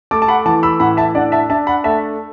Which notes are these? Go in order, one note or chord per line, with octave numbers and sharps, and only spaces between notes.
A3 A5 D6
A5
F#5 B5
E3 A5 D6
B5 E6
A2 F#5 B5
E5 A5
D4 D5 F#5
E5 A5
D4 E5 A5
F#5 B5
A3 E5 A5